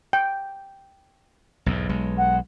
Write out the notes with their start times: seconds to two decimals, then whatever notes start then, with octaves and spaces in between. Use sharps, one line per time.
0.13 G5
1.66 B1 E2 G#2
1.89 B1 G#3
2.18 F#5